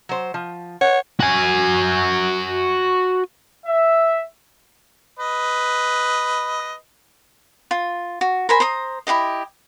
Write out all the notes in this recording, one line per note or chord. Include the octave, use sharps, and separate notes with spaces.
F#3 C5
F3
C#5 F#5
F#4 G#5
E5
B4 D#5
F4
F#4
A#4 C5 G#5 B5
C5 A#5 D#6
E4 G4 G#4 D#5